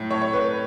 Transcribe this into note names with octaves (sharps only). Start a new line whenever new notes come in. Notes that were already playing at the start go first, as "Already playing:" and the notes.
Already playing: A2 F#3
A2 C#5
C#5
B4